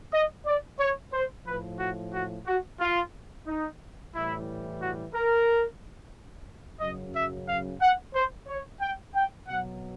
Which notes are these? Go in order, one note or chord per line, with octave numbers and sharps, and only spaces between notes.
D#5
D5
C#5
C5
A2 F3 B4
F#4
F#4
F#4
F4
D#4
A2 E3 G3 E4
F#4
A#4
F#2 C#3 F#3 D#5
E5
F5
F#5
C5
C#5
G5
G5
B2 F#3 F#5